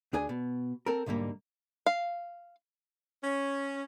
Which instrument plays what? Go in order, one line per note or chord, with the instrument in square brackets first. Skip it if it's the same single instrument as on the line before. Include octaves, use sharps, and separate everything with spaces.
[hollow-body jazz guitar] D2 D4 G#4 G#5
B2
C4 A4 A#4
B1 G#2 D3 G3 A#3
[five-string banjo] F5
[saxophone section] C#4